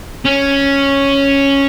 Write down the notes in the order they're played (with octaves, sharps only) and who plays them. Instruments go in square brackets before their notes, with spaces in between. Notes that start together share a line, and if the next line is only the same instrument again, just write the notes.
[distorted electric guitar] C#4